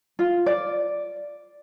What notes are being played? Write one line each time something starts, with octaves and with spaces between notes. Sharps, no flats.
F4
D5